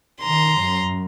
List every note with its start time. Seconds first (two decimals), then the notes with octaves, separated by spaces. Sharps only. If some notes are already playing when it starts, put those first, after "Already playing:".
0.22 D#3 A#5 C6
0.61 F#2